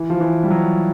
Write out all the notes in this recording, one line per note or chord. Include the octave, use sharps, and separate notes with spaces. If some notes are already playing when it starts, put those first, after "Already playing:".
Already playing: E3
F3
E3
G3
F#3